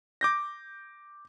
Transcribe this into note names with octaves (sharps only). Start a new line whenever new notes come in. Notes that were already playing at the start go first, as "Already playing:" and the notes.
D6 G6 A#6